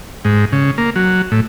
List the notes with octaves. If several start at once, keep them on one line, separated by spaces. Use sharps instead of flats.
G#2
C#3
A#3
F#3
A2